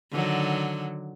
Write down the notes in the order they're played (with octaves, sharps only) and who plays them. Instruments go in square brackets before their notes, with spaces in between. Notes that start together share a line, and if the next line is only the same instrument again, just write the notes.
[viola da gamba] D3 D#3 F#3